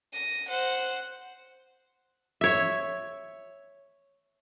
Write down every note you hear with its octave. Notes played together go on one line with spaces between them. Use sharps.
A#6 D#7
C5 F#5
C#5 E5